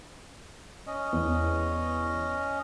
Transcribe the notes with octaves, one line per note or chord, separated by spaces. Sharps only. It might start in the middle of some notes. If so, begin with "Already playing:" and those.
C#4 D#5
E2